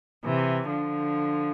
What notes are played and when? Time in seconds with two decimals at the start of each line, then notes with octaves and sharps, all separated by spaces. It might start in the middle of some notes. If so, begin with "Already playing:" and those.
0.25 C3 E3
0.69 D3 F3